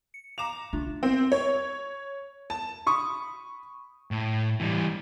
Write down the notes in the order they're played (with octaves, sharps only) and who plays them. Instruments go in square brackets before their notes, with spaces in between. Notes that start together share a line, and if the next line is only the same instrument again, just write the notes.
[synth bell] C#7
[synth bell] F5 E7 [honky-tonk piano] A#5 D6 F7
[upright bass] D3 [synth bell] A3 D4 F4
[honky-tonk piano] C4
C#5
A5
[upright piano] B5 C#6 D#6
[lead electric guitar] A2
E3 G3